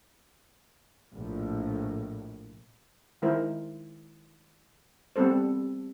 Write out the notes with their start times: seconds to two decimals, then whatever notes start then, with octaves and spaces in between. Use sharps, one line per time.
1.12 A#1 A2
3.22 D#3 G#3 E4 A#4 C5
5.16 G3 B3 C4 A4 C5